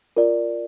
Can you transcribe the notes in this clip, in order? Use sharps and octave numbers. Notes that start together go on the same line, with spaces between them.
F4 A#4 D5